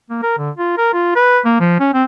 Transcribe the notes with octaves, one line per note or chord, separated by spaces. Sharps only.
A#3
A#4
D3
F4
A#4
F4
B4
A#3
F3
C#4
C4